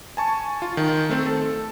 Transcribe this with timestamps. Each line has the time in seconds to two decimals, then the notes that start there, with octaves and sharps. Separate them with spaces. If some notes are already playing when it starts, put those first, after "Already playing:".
0.17 G#5 A5 C#6
0.62 F4
0.77 D#3
1.09 A3 C4 A4
1.26 A4